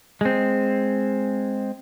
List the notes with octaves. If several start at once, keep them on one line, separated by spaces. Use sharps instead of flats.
G#3 C4